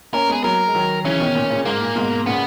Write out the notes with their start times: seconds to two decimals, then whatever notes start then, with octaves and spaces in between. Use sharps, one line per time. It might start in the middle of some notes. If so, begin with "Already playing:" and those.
0.14 A#3 C#4 A#4
0.29 G#3 B3 G#4
0.44 F#3 A#3 A#4
0.68 G#3
0.75 D#3 F#3
1.04 C#3 E3 C#4
1.20 B2 D#3
1.35 A#2
1.50 A#2 C#3
1.65 G#2 A#3
1.81 A#2
1.95 G#2 B2
2.26 A#2 C#3 B3